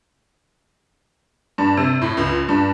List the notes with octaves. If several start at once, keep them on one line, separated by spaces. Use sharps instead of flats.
G2
C3
A2
C#2
G2